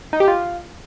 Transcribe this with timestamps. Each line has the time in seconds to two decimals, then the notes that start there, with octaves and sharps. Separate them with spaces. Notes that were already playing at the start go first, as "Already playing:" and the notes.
0.13 D#4
0.20 G4
0.28 F4